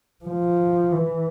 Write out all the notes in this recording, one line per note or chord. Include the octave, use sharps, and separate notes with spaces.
F3
E3